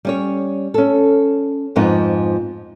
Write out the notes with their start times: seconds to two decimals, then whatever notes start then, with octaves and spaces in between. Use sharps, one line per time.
0.05 G3 C#4 C#5
0.74 C#4 A4
1.76 F2 G#2 F3 B3 D#4